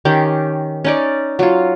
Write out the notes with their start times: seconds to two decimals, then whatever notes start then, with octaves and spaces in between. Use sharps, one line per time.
0.05 D#3 C#4 G4
0.84 C#4 D#4 D5
1.39 F#3 F4